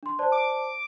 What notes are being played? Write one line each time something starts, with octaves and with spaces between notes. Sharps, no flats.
D4 C6
C5 D5 A5
D6